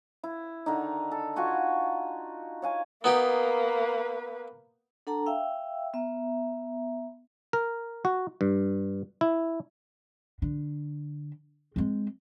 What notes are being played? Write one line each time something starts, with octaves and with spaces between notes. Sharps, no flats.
E4
D3 D#3 D#4
A4
F4 F#4 G#5 C#6
C#5 F5 G#5
A#3 B3 D#4 G4 B4
D4 A4 F#5 A5 A#5
E5 F5 G5 E6
B3 E5 A#5
A#4
F#4
G2
E4
D3
G#3 C4